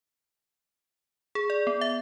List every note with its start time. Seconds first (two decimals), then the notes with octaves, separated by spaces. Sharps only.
1.35 G#4
1.50 D5
1.67 B3
1.81 E5